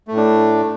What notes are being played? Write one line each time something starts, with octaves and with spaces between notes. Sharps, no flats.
A2 A3 D4